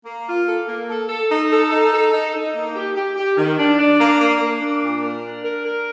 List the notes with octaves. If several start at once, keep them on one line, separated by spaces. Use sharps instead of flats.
A#3
F4
A4
A#3
A4
A4
D#4
A4
D#4
A4
D#4
D#4
A#3
G4
G4
G4
D#3
D4
D4
A#3
A#3
A#3
D4
A#2
A#4
D4
A#4
A#4